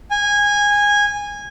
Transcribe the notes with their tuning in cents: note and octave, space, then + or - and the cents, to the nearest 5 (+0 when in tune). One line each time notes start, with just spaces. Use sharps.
G#5 -15